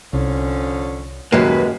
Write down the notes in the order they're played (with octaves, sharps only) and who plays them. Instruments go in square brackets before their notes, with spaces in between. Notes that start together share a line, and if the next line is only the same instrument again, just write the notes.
[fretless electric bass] C2 [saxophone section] D3 F3 C#4
[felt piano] D#1 F#3 C7 [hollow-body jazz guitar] F#2 G#3 A#3 [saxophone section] B4